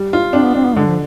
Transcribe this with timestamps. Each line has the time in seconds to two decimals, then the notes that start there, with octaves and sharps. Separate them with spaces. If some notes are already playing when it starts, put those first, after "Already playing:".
Already playing: G3
0.13 F4
0.33 C4 D4
0.45 B3
0.54 C4 D4
0.65 B3
0.76 D3 G#3
0.87 F3